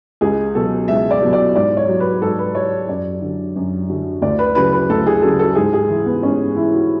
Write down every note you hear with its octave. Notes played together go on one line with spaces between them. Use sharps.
C#2 G#4
B2 F#3 A4
C#2 E5
D5
B2 F#3
D5
G#2 D5
C#5
F#3
B4
G#2 A4
B4
F#3 C#5
F#2 D5
D3 F#3
F#2
D3 F#3
D2 D5
B4
C#3 F#3 B4
B4
D2 A4
G#4
C#3 F#3 A4
A4
G#2 G#4
G#4
E3
B3
G#2 C#4
E3 E4
F#4